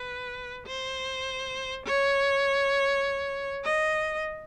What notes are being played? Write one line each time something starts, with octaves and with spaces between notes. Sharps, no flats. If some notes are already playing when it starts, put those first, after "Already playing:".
Already playing: B4
C5
C#5
D#5